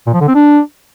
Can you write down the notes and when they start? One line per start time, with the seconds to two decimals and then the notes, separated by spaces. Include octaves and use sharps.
0.07 A#2
0.14 F3
0.21 D3
0.28 C4
0.35 D4